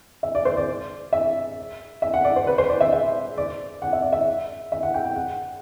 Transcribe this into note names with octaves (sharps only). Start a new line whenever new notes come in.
E5
D5
C5
D5
E5
E5
F#5
D5
C5
B4
C5
D5
E5
E5
D5
F#5
E5
D5
E5
E5
F#5
G5
G5
F#5